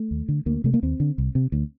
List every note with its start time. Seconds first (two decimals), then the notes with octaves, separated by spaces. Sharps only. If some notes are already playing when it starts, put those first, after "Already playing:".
Already playing: A3
0.11 D#2
0.29 D3
0.46 D2 A#3
0.64 C3 A3
0.74 A#3
0.83 D#2 C4
1.00 D3
1.18 C2
1.35 C3
1.52 D2